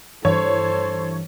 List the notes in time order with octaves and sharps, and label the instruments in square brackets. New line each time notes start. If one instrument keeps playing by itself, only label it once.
[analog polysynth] G2 E3 [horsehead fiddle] A4 C5 [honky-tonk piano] C#5